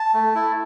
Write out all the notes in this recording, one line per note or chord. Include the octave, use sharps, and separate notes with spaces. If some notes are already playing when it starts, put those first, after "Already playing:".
Already playing: A5
A3
E4